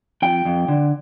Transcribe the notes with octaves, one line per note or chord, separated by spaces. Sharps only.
F2 G5
F2
D3